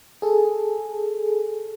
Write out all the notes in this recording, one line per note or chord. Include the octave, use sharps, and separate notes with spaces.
G#4 A4